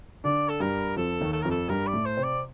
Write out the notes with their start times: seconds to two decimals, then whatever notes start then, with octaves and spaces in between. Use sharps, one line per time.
0.24 D3 D4 D5
0.49 A4
0.60 G2 G3 A#4
0.96 F2 F3 A4
1.21 D#2 D#3
1.33 A4
1.42 F2 F3 A#4
1.51 A4
1.69 G2 G3 A#4
1.87 D5
1.93 A2 A3
2.06 C5
2.17 C3 C4
2.24 D5